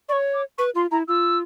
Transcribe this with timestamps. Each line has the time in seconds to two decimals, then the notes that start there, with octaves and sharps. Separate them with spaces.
0.09 D5 C#6
0.12 C#5
0.34 D6
0.58 B4 C#6
0.75 F4 C6
0.91 E4 A#5
1.08 F4 E6